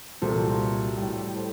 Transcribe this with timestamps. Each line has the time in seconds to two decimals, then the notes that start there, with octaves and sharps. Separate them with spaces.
0.22 C2 A#2 F#3 A4 C5
0.97 A2 G3
1.36 A4 C5